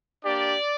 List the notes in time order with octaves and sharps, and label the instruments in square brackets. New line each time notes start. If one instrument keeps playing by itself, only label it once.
[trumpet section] A#3 D4 G4 D5